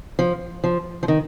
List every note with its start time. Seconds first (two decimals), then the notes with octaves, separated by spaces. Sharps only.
0.19 F3
0.64 F3
1.03 F3
1.08 D#3